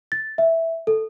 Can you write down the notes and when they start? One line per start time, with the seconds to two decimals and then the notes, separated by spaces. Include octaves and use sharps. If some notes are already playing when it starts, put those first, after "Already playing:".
0.12 A6
0.38 E5
0.87 A4